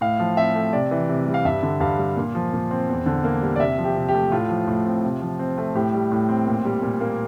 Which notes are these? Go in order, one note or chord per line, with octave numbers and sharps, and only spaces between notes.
A2 F5
F3
C4 E5
A3
C3 D5
E3
C3
G3
F5
G2 E5
D3
G2 F5
G3
A#2
F3
A#2
C4
E2
D3
A#3
G3
D5
C3 E5
F3
G4
C3
G4
A3
A2 F4
F3
A2
C4
C3
F3
C4
A3
A2 G4
G3
A2
C4
A#2
G3
A#2
A#3